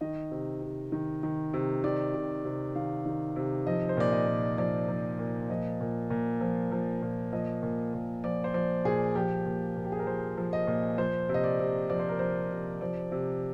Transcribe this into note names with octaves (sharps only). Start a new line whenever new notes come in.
D#3 D#5
C3
C3
D#3
D#3
C3
D#3 D5
C3
C3
D#3 F5
D#3
C3
F3 D#5
C5
A#2 D5
D#5
A#2
F3 D5
F3
A#2
F3 D#5
A#2
A#2
F3
F3
A#2
F3 D#5
A#2
A#2
F3 D5
C5
F3 D5
A#2 G#4
F3 G4
A#2
A#2
G4
G#4
A#4
F3 C5
F3
D#5
A#2
F3 C5
C3
D#5
D5
C3
F3 D5
C5
A#4
F3 C5
C3
F3 D5
C3